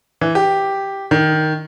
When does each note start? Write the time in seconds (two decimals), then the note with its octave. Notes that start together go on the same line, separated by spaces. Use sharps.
0.21 E3
0.35 G4
1.11 D#3